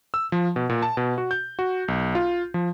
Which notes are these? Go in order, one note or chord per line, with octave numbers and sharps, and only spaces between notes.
E6
F3
B2
A#2
A5
B2
F#4
G6
F#4
B1
F4
F3